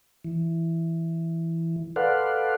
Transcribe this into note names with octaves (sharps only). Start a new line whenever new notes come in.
E3
A4 B4 D5 F5 F#5 C6